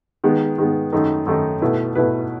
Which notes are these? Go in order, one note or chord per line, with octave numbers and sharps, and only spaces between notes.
D#3 G#3 B3
D#3 G#3 B3
F#2 D#3 A3 D#4
F#2 D#3 A3 D#4
B2 A3 E4 B4
B2 A3 E4 B4